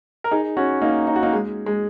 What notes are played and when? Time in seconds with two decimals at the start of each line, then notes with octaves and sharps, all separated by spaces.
0.24 A#4
0.31 D#4 G#4
0.57 C#4 F#4
0.81 A#3 D#4
1.07 D#4
1.16 F#4
1.23 A#3 D#4
1.33 G#3
1.66 G#3